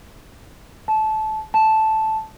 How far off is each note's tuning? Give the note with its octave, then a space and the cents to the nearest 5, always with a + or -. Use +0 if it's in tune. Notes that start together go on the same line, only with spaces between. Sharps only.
A5 -20
A5 -5